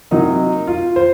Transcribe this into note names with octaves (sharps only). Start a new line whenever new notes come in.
C3 F#3 A#3 D#4
F4
C5